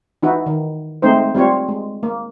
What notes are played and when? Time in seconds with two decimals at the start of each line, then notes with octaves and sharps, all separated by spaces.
0.23 E3 D#4 E4 F#4
0.46 D#3
1.02 G#3 A3 C4 D#4 C5
1.35 G3 C4 F4 C#5
1.68 G#3
2.03 A#3